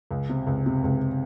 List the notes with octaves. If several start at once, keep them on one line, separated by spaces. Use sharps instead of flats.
C#2
C3
C#2
C3
C#2